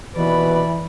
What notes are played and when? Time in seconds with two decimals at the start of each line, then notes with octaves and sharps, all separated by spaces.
0.15 D#2 B2 E3 B4 D5 B5